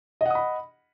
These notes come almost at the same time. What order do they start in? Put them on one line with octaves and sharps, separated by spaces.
D#5 F#5 D#6 B5